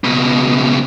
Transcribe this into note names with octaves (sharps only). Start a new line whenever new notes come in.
C#2 B2